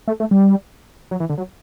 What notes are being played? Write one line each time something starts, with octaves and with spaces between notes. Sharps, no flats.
A3
A3
G3
F#3
E3
D3
F#3